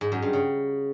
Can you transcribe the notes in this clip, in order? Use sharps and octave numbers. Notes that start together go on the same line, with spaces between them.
G#2
F#2
G2
C#3